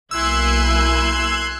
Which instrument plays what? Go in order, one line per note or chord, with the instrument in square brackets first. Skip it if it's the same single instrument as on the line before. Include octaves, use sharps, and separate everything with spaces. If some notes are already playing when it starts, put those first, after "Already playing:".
[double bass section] B1 A#3 [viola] E4 G#5 [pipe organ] C6 F#6 G#6 [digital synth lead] E6